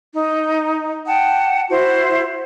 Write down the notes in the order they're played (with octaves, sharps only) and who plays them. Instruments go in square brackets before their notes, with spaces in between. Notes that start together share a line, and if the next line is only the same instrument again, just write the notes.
[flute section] D#4
F#5 G5 A5
E4 F#4 C5